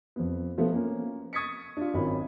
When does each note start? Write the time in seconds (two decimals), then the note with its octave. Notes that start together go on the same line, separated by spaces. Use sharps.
0.16 F2 B3
0.57 B2 F3 A3 B3
0.72 A#3 C#4
1.33 C#6 D#6 G#6 A6 B6 C#7
1.77 D4 F4
1.94 G#1 F#3 C#4 A#4 D#5 B5